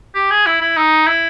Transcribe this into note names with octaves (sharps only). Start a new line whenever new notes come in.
G4
G#4
E4
E4
D#4
E4